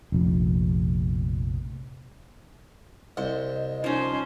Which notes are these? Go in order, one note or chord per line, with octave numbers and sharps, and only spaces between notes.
F1 A#1
C2 C5 D#5
F3 C#4 D#4 C5